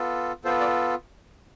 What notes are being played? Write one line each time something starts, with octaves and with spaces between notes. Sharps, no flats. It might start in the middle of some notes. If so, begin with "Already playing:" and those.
Already playing: B3 F4 A4
B3 F4 A4 C5
D5